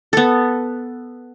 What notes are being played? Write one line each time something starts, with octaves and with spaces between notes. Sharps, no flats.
B3 A4